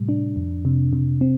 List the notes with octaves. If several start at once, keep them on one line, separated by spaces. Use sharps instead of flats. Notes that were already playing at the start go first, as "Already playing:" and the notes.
Already playing: A2 C3 G3
D4
F2
C3
C3
C4